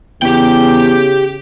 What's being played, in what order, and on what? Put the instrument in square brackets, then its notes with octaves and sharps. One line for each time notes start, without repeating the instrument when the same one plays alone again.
[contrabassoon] E2 [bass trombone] C#3 [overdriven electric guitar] G4 G5